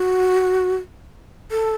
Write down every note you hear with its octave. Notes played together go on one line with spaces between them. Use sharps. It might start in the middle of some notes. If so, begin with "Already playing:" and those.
Already playing: F#4
A4